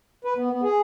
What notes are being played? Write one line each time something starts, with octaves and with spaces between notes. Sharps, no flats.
B4
B3
B3
G#4